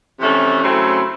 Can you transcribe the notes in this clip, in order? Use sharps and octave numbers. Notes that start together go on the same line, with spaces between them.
F2 C3 E3 A3 C#4
C#3 F#3 A3 C4 E4